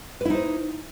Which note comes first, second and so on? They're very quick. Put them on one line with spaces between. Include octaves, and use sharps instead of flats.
B4 E4 D#4 C5